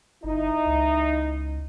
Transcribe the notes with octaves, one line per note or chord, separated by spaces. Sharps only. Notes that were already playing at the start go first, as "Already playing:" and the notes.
G1 D#4 E4
C#2